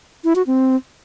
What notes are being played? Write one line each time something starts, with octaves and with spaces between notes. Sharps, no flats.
E4
F#4
C4